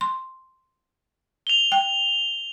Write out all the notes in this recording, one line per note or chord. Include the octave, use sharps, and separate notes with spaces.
C6
F7 G7
G5